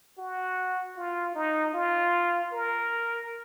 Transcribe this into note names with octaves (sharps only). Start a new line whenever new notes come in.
F#4
F4
D#4
F4
A#4